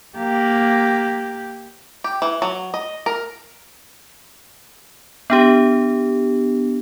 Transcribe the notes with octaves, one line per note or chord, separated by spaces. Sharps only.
A#3 G4
G4
E3
F#3
D#5
A#4
B3 D4 G4